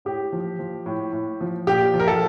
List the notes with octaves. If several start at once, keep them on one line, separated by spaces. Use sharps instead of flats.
A2 G4
F3
F3
A2
A2
F3
A#2 G4
F3
A#4
A4